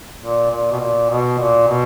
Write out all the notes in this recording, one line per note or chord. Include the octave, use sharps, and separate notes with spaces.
A#2
A#2
B2
A#2
B2
A#2
B2